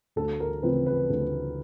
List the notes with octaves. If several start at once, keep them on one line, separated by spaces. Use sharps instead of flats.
D2 A4
A#4
C#3 F3 A3 C4 B4
B4
D2